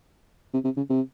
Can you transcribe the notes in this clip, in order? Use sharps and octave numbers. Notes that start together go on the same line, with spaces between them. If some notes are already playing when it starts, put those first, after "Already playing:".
C3
C3
C#3
C3